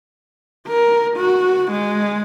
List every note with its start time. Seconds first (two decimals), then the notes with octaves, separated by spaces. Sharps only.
0.68 A#4
1.17 F#4
1.71 G#3